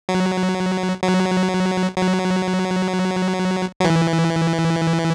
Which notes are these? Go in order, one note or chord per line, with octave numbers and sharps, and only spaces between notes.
F#3
F#3
F#3
F#3
E3